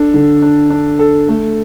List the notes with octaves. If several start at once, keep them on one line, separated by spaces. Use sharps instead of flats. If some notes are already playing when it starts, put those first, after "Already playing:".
Already playing: D4 A4
D3
D4
D4
A4
A3